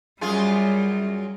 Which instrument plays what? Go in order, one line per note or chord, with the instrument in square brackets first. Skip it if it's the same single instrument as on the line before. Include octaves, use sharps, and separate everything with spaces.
[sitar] F#2 F4 G#4 [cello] G3